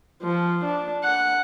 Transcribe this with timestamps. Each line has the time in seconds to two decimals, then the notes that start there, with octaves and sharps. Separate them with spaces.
0.22 F3
0.64 D4
1.04 F#5